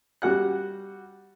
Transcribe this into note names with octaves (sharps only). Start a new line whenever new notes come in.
G3 F#4 F#5 F#6